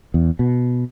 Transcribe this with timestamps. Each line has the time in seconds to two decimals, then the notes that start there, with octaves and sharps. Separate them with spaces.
0.14 E2
0.39 B2